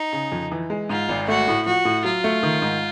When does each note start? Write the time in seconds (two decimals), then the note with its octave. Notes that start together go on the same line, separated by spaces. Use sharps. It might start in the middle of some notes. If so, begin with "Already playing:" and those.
Already playing: D#4
0.13 C#3
0.32 F2
0.52 E3
0.70 G#3
0.89 G#2 F4
1.09 G#1
1.28 A3 F#4
1.48 A2
1.66 F3 F#4
1.85 A2
2.04 F#3 F4
2.24 A3
2.43 D#3
2.62 G#2